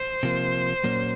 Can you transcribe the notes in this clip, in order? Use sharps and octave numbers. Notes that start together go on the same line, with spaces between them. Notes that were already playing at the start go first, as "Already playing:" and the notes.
Already playing: C5
C3 F3 A#3
A#2 F#3 A#3 C#4